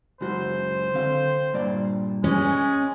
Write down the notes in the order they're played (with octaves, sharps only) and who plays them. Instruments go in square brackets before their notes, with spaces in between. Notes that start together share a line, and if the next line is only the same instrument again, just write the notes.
[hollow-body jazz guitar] C#2 F#2 F#4 [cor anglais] C5
[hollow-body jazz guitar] D3 C4 F5
G2 A#2 D5
[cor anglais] G#3 [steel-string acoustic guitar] C#4